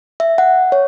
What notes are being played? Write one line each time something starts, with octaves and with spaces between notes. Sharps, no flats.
E5
F#5
C#5